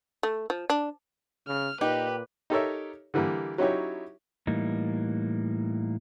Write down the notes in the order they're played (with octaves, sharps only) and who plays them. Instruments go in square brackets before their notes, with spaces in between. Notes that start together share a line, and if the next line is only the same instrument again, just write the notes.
[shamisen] A3
F3
D4
[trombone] C#3 [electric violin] F6
[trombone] A#2 [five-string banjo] D#4 [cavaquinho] G4 [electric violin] B4
[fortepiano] D#4 G4 A4 A#4 C#5 E5
D3 E3 G3 A#3
F#3 C#4 D#4 E4 G4 C#5
[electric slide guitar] A2 E3 G3 A#3 D#4